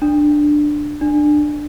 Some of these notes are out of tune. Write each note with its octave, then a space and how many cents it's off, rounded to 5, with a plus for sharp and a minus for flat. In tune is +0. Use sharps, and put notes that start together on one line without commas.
D4 +10
D4 +20